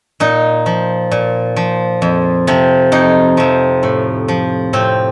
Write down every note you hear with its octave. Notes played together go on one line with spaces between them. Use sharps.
A#2 D#4
F3
A#2
F3
F2
C3 F3
F2 D#4
C3 F3
A2
F3
A2 C4